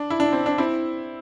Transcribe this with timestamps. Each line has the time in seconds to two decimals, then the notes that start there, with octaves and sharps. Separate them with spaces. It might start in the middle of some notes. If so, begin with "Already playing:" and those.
Already playing: D4
0.10 E4
0.20 D4
0.33 C4
0.46 D4
0.58 C4 E4